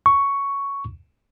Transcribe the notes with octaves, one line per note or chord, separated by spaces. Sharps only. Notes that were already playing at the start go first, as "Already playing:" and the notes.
C#6